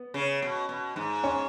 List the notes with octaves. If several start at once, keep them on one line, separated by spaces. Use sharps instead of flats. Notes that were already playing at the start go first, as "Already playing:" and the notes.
Already playing: B3
C#3
B2
B2
G#2
C#4